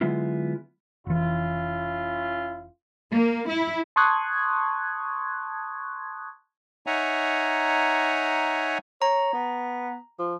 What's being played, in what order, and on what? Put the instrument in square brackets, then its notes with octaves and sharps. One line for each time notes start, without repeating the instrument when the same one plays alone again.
[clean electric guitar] D3 F#3 G#3 B3 E4 F4
[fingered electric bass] F1 E3 [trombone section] C#4 E4 F4
[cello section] A#3
E4
[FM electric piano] A5 C6 C#6 D#6 F#6 G#6
[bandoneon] D#4 C#5 E5 F#5 G#5 A#5
[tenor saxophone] C#5 [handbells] A#5
[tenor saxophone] B3
F3